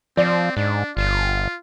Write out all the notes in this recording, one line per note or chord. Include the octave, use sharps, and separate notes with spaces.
F3 C4 D5
G#2 D4
G1 F4